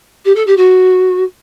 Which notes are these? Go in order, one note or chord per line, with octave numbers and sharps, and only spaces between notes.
G4
A4
G4
F#4